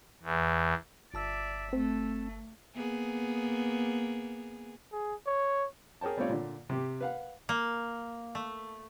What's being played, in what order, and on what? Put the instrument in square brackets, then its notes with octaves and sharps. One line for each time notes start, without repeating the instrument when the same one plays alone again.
[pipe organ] E2
[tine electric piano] G1 A5 E6 [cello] D5 E5
[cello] A3 [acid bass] C4
[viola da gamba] A#3 B3 G#4
[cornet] G#4
C#5
[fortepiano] G#4 A#4 C#5 G5 A5
G3 A3 C4 F4 C#5 D5
A#2 D3
C3 G4
B4 F5 F#5
[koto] A#3
A3